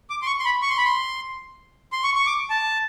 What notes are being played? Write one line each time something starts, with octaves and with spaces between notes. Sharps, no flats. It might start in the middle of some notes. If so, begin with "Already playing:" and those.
D6
C6
C#6
C6
B5
C#6
C6
B5
C6
C6
C#6
C#6
D6
A5